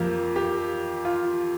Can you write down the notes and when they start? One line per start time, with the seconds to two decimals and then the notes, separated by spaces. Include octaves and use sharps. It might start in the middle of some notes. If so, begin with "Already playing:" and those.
Already playing: F2 F3 A#3 G4
0.36 G4
1.05 F4